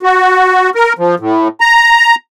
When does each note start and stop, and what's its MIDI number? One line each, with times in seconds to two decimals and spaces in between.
0.03 0.70 66
0.75 0.93 70
0.99 1.15 53
1.20 1.48 45
1.61 2.15 82